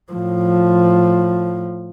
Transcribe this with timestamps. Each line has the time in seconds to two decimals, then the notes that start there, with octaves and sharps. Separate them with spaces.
0.12 A2 F3